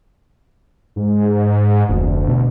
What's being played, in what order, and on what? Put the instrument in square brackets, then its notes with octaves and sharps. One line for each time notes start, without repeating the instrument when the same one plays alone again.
[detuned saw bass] G#2
[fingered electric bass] F1 [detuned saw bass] D2
[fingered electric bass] B2